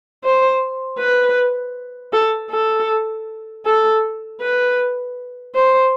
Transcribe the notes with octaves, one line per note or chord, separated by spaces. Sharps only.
C5
B4
A4
A4
A4
B4
C5